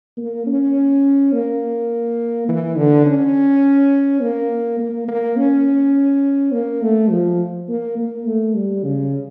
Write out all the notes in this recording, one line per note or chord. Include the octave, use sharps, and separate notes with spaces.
A#3
C#4
A#3
E3
D3
C#4
A#3
A#3
A#3
C#4
A#3
A3
F3
A#3
A#3
A3
G3
C#3